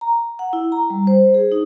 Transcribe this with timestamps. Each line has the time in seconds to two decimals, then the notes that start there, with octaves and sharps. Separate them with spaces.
0.01 A#5
0.39 F#5
0.53 E4
0.72 A#5
0.90 G3
1.07 C5
1.34 G#4
1.52 D#4